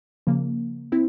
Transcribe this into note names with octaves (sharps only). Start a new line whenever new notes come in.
C#3 F3 A#3
C4 E4